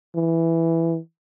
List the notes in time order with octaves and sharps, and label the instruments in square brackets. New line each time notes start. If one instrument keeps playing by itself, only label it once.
[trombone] E3